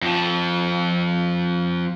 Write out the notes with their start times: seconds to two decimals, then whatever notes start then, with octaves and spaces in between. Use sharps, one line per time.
0.02 F2 F3